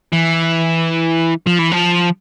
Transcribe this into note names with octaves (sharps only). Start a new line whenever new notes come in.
E3
F3
E3
F3